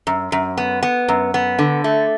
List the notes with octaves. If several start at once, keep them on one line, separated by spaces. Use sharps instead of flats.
F#2
F#2
B3
B3
F#2
B3
D3
A3